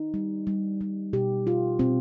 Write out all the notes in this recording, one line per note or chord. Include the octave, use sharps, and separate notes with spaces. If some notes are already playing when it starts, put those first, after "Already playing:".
Already playing: D#4
G3
G3
G3
B2 G4
G3 F4
B2 C4